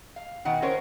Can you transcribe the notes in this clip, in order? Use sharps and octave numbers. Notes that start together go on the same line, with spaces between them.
F5
B2 D#3 F#5
C#4 A#4 C5 C#5